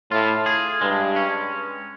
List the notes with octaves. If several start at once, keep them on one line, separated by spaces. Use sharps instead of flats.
A2 F4
G#4
G2 G#3
C#4